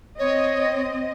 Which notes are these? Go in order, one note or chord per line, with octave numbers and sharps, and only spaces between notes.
C4 C#5 D#5